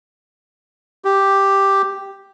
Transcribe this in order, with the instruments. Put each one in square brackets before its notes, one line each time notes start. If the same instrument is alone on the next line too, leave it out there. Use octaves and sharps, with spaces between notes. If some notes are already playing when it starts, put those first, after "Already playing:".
[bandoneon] G4